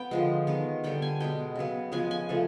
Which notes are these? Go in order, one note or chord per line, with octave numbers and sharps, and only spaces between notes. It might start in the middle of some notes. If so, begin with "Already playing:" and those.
Already playing: B3 G5
D3 F3 G#3
D#3 G#3 B3
D3 G3 B3 G5
G#5
B2 G#3 B3 G5
C#3 F#3 B3
C#3 F3 G#3 B3 G#5
G#5
C#3 F3 A3